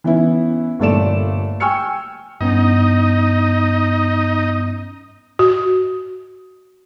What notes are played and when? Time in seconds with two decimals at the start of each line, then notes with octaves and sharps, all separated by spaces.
0.04 E3 B3 C#4 E4
0.79 G1 A#2 A3 A4 D5 E7
1.60 G5 G#5 C#6 E6 F6 C#7
2.41 G2 B3 C#4 D#4 D#5
5.39 F#4